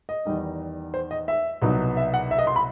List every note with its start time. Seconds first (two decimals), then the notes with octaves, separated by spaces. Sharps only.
0.09 D#5
0.25 E2 D#3 G3 D#4
0.94 C5
1.11 D#5
1.28 E5
1.62 C2 B2 F#3 B3 D#4
1.97 E5
2.14 F#5
2.31 E5
2.39 D#5
2.47 C6
2.56 B5